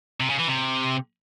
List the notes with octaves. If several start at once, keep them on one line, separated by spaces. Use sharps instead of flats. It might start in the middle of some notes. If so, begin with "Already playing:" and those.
C3
C#3
E3
C3